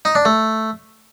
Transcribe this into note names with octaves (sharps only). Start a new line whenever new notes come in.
D#4
D4
A3